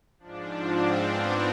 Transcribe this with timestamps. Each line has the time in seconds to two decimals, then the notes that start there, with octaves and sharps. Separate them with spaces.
0.19 G#2 F3 D4
0.48 C4
0.77 C4
1.06 B3